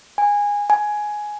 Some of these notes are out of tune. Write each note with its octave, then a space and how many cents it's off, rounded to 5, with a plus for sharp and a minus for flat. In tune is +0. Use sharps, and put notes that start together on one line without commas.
G#5 -15
G#5 +10